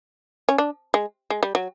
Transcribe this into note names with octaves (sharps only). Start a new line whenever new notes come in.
C#4
D4
G#3
G#3
G3
F#3